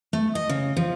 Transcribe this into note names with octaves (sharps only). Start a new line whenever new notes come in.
A3
D#5
C#3
F3